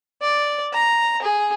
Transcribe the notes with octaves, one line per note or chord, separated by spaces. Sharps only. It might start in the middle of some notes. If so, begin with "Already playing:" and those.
D5
A#5
G#4